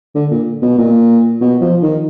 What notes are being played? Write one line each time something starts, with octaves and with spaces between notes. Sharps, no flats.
D3
A#2
B2
A#2
B2
F3
D#3